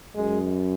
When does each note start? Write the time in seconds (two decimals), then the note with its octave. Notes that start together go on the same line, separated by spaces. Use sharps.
0.15 F#2 G#3